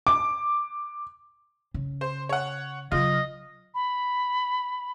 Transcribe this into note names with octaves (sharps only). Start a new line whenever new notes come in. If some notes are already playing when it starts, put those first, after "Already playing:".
D6
C#3
C5
C#5 F#5
C#3 F#3 F4 D#5
B5